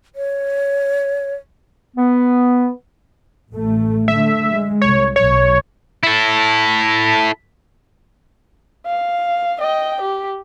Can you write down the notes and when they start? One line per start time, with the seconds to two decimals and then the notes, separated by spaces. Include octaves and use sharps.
0.16 C#5
1.97 B3
3.52 A1 A3
4.08 D3 A3 E5
4.52 G#3
4.82 C2 C#5
5.16 B1 B2 C#5
6.03 E4 A4
8.87 F5
9.61 D#5 G5
10.02 G4